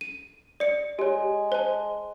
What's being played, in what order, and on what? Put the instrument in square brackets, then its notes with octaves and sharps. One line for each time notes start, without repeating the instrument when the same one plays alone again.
[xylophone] D#7
D5 C#7
[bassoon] G#3 [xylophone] G4 C#5
[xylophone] C5 A5